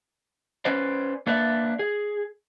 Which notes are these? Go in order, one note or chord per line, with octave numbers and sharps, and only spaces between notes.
C#4 B4 C5 D5
A#3 D4 B4 D5 E5
G#4